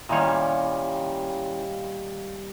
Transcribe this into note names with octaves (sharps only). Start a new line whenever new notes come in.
A#2 D#3 G3 C#4 E4 C#5 D#5 F5